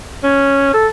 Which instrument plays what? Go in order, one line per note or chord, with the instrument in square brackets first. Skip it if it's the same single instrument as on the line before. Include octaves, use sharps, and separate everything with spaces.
[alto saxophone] C#4
A4